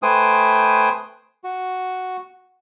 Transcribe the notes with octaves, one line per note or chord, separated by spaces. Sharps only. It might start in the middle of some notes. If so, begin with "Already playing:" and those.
A3 B4 C5 G5 G#5 D#6
F#4